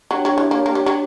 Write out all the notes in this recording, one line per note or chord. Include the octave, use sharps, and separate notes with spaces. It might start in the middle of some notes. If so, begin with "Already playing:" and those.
F#3 D4 G4 C#5 G5
F#3
E3
A#3
A#3
G3
F#3